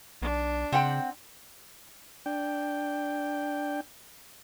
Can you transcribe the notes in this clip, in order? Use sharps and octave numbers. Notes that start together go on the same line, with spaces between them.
B1 D4
C#3 C4 F#5 G5
D4 G5